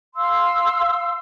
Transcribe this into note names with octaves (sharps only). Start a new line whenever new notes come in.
F5 C6 E6